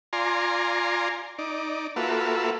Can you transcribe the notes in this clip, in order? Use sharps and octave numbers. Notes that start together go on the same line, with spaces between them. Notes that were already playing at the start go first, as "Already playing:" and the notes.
F4 D5 G#5 A#5 C6
D#4 D5
A#3 F4 F#4 A4 B4 E5